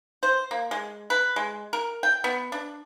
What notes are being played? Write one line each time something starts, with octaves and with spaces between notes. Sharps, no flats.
C5
A#3
G#3
B4
G#3
A#4
G5
B3
D4